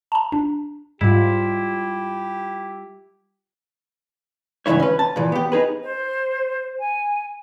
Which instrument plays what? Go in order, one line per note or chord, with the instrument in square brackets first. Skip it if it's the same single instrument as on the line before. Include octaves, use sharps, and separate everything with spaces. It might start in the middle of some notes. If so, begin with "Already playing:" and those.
[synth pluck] A5 A#5
D4
[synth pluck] G#2 [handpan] G3 F4 [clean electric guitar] E4 [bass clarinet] G4
[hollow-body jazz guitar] C#2 G2 A#2 E3 E4 C#5
C#4 B4
A5
A#2 E3
B3 G4
D#4 G#4 B4
[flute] C5
G#5